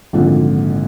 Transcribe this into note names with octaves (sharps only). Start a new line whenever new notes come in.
G#1 A#2 D3 F3